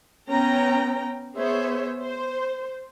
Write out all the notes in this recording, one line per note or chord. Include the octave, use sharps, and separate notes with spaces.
B3 C#4 G5 A#5
B3 G#4 C5 C#5 E5
C5